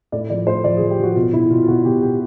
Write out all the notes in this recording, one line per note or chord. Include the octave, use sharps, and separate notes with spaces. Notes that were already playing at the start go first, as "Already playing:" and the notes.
A2 D5
F3 D5
A2 C5
F3 D5
G#4
F3
G4
F3 F#4
B2 F4
B2 E4
B2 F4
F4
B2 F#4
B2 G4
B2 G4